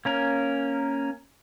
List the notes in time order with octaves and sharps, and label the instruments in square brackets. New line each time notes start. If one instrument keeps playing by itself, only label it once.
[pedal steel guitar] A#3 C#4 A#4